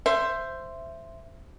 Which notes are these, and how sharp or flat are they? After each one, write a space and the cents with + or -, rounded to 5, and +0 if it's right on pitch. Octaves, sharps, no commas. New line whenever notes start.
C5 +0 E5 +15